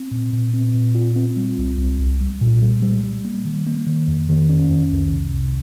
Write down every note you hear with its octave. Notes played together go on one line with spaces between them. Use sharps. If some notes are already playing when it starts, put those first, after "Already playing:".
Already playing: C4
A#2
A#2
C4
A#2
F4
C4
G3
C2
C2
C2
G3
A#2
G3
G3
G3
A#3
D#3
A#3
D#3
F2
D#3
C#4
F2
C2
C3
C2